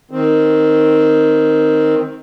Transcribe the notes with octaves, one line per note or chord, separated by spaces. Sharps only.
D#3 C4